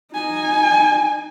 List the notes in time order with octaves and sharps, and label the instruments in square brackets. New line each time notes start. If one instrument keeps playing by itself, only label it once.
[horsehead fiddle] D#4 G#5